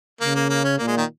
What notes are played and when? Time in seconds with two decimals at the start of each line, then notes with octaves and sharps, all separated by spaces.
0.21 C#3 A#3
0.35 A#3
0.50 A#3
0.64 C#4
0.78 A#2 A#3
0.88 G#3
0.97 D#3